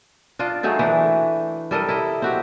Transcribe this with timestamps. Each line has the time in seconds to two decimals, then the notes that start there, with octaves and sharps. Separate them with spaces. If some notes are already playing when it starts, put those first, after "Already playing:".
0.39 D4 F4 D5 D#5
0.63 F#3 A3 D#4 G#4
0.79 E3 A3 D4
1.71 G3 A4 A#4 D#5
1.89 E4 D#5
2.22 C4 F#4 G4